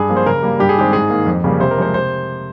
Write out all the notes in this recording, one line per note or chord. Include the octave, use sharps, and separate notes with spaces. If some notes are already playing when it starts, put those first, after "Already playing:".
Already playing: G2 G#4
F3 A#3
C5
C#3 A#4
G3 A#3
G2 G4
G#4
D#3 G#3 C4 G4
G#2 G#4
D#3 A#3
F2
C#3 G3 A#3
C3 C5
A#4
F3 G#3 C5
C3 C5